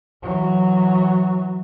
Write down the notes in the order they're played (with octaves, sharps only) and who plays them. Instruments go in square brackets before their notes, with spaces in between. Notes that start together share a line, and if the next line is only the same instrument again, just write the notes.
[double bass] E3 F#3